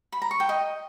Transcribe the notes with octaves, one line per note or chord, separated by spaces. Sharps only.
B5
A#5
C#6
G5
D#5